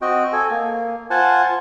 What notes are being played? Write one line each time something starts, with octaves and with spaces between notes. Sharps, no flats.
C4 F#4 D#5 G5
A4 G#5
A#3
F4 C5 F#5 G#5 A5